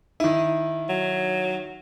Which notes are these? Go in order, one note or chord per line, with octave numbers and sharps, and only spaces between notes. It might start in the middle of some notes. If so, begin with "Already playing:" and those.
D#3 D#4 E4
F#3